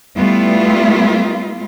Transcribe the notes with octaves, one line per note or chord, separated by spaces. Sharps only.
G3 A3 B3 E4 F4